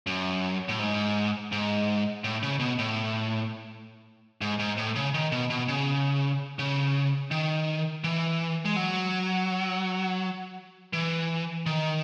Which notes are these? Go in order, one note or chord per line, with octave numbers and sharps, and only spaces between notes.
F#2
A2
G#2
G#2
A2
C#3
B2
A2
G#2
G#2
A2
C#3
D#3
B2
B2
C#3
C#3
D#3
E3
G#3
F#3
E3
D#3